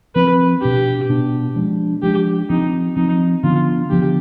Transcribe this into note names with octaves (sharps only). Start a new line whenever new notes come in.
F3 C4 B4
B2 B3 D4 G4
B2 B3 D4
F3 G#3 D4
F3 G#3 D4 G4
F3 C4 D#4
F3 C4 D#4
D3 F3 B3 D4 F4
D3 F3 B3 D4 G4